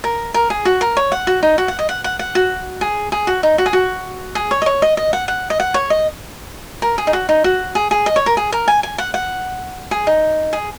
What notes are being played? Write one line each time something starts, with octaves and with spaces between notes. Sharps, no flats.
A#4
A#4
G#4
F#4
A#4
C#5
F#5
F#4
D#4
F#4
F#5
D#5
F#5
F#5
F#5
F#4
G#4
G#4
F#4
D#4
F#4
G#4
F#4
G#4
C#5
D#5
C#5
D#5
D#5
F#5
F#5
D#5
F#5
C#5
D#5
A#4
G#4
D#4
F#4
D#4
F#4
G#4
G#4
D#5
C#5
A#4
G#4
A#4
G#5
G#5
F#5
F#5
G#4
D#4
G#4